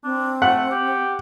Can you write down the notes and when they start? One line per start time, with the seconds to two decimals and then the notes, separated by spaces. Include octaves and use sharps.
0.04 C4 D4
0.42 A3 F#5
0.71 G4